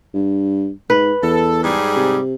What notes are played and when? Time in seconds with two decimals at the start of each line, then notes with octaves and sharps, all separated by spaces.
0.14 G2
0.90 G#2 B4
1.23 E2 A4
1.62 G#2 G3 G#4
1.96 C3